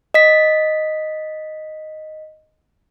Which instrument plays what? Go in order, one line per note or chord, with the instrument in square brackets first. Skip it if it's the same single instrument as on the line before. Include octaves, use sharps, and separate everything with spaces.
[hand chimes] D#5 B6